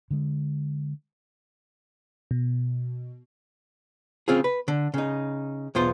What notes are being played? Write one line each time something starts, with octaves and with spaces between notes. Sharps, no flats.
D3 G#3
B2
C#3 C4 F4 G#4
B4
D3
C#3 D#4
B1 E2 B3 F4 C5